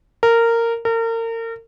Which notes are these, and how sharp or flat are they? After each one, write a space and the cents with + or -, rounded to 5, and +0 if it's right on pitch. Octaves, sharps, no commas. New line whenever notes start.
A#4 -15
A#4 -35